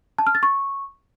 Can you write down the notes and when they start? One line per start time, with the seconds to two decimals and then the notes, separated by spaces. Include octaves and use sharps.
0.18 A5
0.27 F6
0.35 A6
0.43 C#6